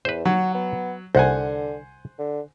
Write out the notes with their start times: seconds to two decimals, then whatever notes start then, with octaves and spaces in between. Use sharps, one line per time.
0.05 E2 B4 C5
0.25 F#3 F#4
0.54 B3
1.15 C2 D3 C5 F#5 G#5
2.18 D3